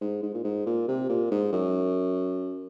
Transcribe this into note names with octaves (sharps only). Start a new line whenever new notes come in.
G#2
G#2
A#2
G#2
A#2
C3
A#2
G#2
F#2